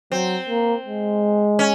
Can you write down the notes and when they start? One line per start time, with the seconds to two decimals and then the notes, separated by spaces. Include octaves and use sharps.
0.12 F#3 C4
0.49 A#3
0.86 G#3
1.59 C#4